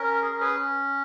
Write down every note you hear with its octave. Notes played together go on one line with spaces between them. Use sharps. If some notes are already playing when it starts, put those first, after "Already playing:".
Already playing: C#4 A#4
G#4
A#4
G#4 B4